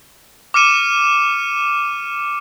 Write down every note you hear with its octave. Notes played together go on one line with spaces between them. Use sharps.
D6 F6 C#7 D#7 E7